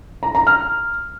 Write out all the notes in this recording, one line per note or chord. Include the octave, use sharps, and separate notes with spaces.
A#5
A#5
F6